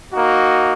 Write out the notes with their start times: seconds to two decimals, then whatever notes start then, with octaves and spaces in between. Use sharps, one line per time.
0.13 A#3 D#4 F#4